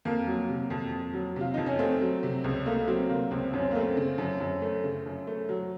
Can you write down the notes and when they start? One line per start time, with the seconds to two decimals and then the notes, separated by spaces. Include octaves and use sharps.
0.05 F2 A#3
0.27 F#3
0.49 C3
0.70 F2
0.92 F2
1.13 F#3
1.36 C3 F4
1.54 F2 D#4
1.66 C#4
1.79 A3 C4
2.01 F#3
2.23 C3
2.44 C#2
2.66 A3 A#3
2.88 F#3 C4
3.09 C3 A#3
3.31 C#2 C4
3.53 F#2 C#4
3.62 C4
3.71 A3 A#3
3.80 C4
3.97 C#3
4.18 F#2
4.40 F#2
4.62 A3
4.84 C#3
5.06 F#2
5.27 A3
5.49 F#3